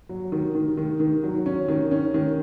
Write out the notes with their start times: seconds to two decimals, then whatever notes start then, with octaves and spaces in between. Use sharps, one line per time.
0.09 F#3
0.32 D#3
0.55 D#3
0.77 D#3
1.00 D#3
1.23 F#3
1.46 C#4
1.68 D#3
1.91 C#4
2.14 D#3